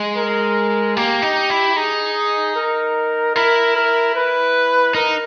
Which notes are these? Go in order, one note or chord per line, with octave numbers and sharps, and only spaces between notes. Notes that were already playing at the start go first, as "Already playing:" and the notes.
Already playing: G#3
A#4
A#3 G4
D#4
E4
D#4 G#4
A#4
E4 A#4
A#4
B4
D#4 A#4